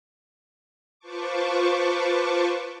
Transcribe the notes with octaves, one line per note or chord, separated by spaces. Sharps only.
F4 B4 C5 A5 C#6 D6